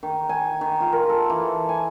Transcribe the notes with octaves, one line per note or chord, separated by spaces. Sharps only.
D#3
G#5
D#3
F4
A#4
A4
E3
G#5